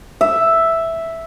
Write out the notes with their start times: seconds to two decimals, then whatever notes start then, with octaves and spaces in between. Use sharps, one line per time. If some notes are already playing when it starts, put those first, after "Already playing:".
0.21 E5